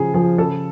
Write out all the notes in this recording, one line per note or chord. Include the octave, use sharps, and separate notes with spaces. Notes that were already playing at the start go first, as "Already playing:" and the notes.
Already playing: C#3 F3 G#4
F3 G#4
C#3 A4